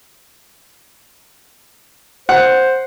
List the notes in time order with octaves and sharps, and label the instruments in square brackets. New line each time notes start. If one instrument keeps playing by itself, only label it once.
[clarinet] C5 [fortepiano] F#5